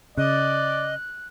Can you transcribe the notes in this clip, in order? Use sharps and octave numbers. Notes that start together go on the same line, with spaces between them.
C#3 D5 D#5 F#6